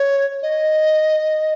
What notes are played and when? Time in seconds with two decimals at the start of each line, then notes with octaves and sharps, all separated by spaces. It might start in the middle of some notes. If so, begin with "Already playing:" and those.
Already playing: C#5
0.43 D#5